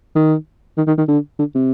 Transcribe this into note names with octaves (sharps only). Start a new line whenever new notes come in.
D#3
D#3
D#3
D#3
D3
D3
C3